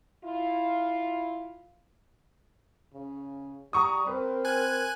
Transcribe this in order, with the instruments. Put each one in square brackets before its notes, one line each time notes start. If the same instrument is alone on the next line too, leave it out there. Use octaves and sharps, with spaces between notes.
[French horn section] E4 F4
[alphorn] C#3
[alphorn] G3 [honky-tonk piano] A#5 C#6 D#6
[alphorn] C4 [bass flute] A#4 [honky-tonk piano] B4
[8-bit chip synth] G#5 F#6 G#6